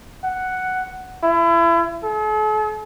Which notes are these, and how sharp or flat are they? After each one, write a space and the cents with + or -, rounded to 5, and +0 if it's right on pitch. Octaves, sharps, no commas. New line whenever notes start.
F#5 +5
E4 +30
A4 -45